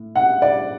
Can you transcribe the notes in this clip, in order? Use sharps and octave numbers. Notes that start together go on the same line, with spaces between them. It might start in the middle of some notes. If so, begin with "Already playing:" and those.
Already playing: A2
F#5
D5